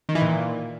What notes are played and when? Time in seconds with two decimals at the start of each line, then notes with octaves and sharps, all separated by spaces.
0.09 D#3
0.15 E3
0.22 A#2